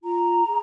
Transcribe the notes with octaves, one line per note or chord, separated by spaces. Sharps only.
F4 A#5
G#4